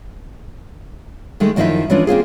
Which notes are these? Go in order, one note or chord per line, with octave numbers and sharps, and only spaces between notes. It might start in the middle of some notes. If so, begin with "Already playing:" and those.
D#3 G#3 A3
F#2 D#3 F3 D#4 E4 E5
E3 G#3 C#4 D4 F4
A#3 C4 F4 G#4